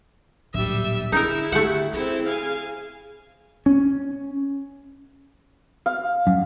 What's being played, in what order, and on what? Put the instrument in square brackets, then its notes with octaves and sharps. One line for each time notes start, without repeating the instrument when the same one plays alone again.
[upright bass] D1 A#2 [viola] G3 E5
[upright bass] D3 [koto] D#4 A#4 [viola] E4 E5 [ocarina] G#4
[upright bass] D3 [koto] A3 F#5 [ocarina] G4
[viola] C4 E4 [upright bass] C#4 [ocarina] G#4
[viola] F5 G#5
[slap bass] C#4
[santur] F5
[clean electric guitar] F#2